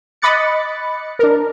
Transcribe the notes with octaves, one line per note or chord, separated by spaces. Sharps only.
D#5 B5 D6 F#6 A6 C#7
D4 A#4